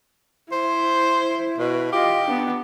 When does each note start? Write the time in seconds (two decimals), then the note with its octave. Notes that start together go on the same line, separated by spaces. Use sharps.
0.52 E4 C5
1.58 B2
1.92 F4 G4 D#5
2.26 B3 D4